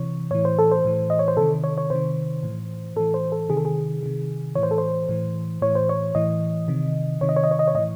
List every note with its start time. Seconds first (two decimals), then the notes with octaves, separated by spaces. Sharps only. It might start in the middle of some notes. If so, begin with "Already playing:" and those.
Already playing: C3 E3 C#5
0.31 A2 E3 C#5
0.45 C5
0.59 A4
0.72 C5
0.85 A2 E3
1.10 D#5
1.19 C#5
1.28 C5
1.37 C3 D#3 A4
1.64 C#5
1.78 C#5
1.90 C3 D#3 C5
2.43 A2 E3
2.96 A2 E3 A4
3.14 C5
3.32 A4
3.49 C3 D#3 G#4
3.57 A4
3.65 G#4
4.03 C3 D#3
4.55 E3 C#5
4.58 A2 C5
4.71 A4
4.78 C5
5.09 A2 E3
5.62 A2 E3 C#5
5.75 C5
5.89 C#5
6.15 A2 E3 D#5
6.68 C3 D#3
7.21 C3 D#3 C#5
7.29 D#5
7.37 C#5
7.44 D#5
7.51 C#5
7.59 D#5
7.68 C#5
7.75 A2 E3 D#5